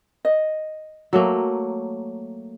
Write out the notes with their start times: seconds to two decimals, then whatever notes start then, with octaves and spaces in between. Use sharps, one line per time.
0.25 D#5
1.13 F#3 A3 A#3